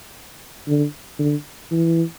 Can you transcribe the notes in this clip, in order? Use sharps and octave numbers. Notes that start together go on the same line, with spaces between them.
D3
D3
E3